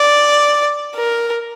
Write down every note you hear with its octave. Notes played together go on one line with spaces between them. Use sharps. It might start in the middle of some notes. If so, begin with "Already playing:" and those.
Already playing: D5
A#4